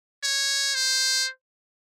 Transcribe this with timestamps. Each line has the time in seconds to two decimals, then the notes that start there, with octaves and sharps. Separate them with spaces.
0.23 C#5
0.75 C5